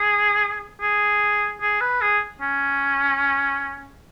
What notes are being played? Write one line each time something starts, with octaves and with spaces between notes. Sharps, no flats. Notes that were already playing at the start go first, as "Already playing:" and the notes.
Already playing: G#4
G#4
G#4
B4
G#4
C#4